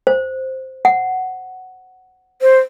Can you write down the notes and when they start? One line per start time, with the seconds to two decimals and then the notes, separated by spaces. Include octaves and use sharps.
0.07 C5
0.85 F#5
2.42 C5